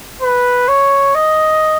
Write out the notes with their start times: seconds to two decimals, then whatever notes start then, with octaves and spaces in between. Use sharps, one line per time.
0.22 B4
0.68 C#5
1.15 D#5